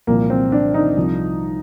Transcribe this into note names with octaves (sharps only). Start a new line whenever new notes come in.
C2 A#2 F3 A#3
C4
D4
D#4
C2 C3 F3